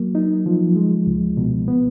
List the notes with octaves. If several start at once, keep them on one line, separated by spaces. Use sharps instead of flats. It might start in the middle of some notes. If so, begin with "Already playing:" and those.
Already playing: F#3 A#3
D#4
F3
G#3
C#2
B2
B3